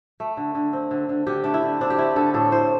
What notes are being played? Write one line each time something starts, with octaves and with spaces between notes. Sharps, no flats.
A3
D3
D3
C4
D3
D3
D3 G4
A3 D4
E4
D3
C4 D4
G4
A3 E4
D3 A4
A2 A4
A2 C5